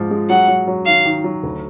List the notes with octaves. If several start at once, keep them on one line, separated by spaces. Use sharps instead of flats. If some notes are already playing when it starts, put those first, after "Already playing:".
Already playing: G#2 F3
G#3
F#3 F#5
F#3
F#3
D#3 F5
D#3
F#3
D2